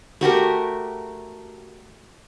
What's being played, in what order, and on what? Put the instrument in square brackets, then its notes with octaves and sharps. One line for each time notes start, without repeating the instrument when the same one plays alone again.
[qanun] A3 F#4 G4 A#4